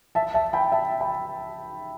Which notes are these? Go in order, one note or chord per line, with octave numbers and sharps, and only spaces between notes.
E5 A5
E5 A5
G5 B5
E5 A5
G5 B5